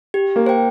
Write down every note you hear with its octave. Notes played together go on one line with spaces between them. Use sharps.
G4
A#3
C5 G5